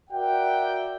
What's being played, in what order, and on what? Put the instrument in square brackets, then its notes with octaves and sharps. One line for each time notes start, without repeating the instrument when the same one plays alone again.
[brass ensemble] F#4 A#4 D5 E5 F#5 G5